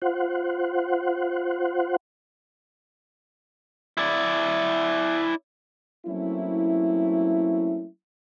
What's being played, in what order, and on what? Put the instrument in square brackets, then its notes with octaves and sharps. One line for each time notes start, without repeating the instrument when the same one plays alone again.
[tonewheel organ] F4 C5 F#5
[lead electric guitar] E4 D5
[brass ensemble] F#3 A3 A#3 C4 C#4 E4